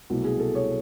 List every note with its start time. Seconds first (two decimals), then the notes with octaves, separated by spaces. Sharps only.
0.10 C2 B2 F#3 A3 F#4
0.25 G#4
0.40 A4
0.55 C#5